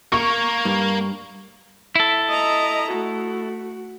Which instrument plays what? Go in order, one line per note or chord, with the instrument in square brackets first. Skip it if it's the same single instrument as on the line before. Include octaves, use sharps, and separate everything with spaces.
[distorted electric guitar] A#3 A#4 [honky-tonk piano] C#6
[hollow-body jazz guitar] G2
[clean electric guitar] E4 A4
[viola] D#5 A#5
A3 F#4